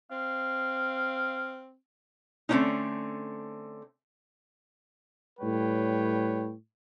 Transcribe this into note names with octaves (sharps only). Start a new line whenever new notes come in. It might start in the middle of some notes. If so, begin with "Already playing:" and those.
C4 F5
D3 A3 A#3 C4 C#4 D#4
A2 G3 B4 C#5 G5